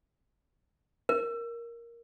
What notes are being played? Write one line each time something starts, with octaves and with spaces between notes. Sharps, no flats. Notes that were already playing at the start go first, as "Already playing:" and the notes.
A#4